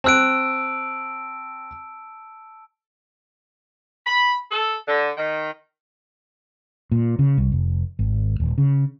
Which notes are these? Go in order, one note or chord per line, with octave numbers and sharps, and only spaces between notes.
C4 A5 E6 F#6 D7
B5
A4
D3
D#3
A#2
C#3
C2
F1
G#1
D#1
C#3